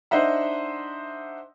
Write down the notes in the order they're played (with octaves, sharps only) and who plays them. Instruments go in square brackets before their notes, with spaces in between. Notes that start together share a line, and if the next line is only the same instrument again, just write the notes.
[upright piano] D4 D#4 C5 D#5 E5 F#5